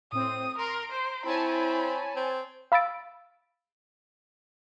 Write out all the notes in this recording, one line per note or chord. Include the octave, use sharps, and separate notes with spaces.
A2 C4 D#6
A#4 A#5 C6 D7
C5
C4 E4 C#5 G#5 A5 B5
C4
F5 B5 E6 A6 D7